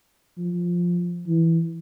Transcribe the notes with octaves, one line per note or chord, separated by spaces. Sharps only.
F3
E3